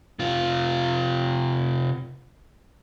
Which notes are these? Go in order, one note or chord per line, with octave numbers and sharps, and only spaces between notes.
C3 F4